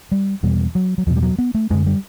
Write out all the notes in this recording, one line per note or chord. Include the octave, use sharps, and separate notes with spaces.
G3
E2 B2 G3
F#3
F#3
E2 B2 F3
G3
F#3
B3
A3
F#2 D3 G#3
G3